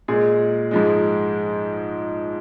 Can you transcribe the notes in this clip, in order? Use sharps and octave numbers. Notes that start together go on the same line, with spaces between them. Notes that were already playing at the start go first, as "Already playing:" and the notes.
A#2 G#3 G#4
G#2 F3 G#3